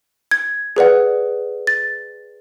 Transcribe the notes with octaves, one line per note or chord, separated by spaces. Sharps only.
G#6
G#4 B4 D5 F#5
A6